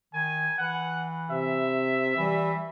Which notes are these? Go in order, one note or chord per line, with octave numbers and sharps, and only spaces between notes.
D#3 G#5
E3 F#5
C3 E5
E3 G3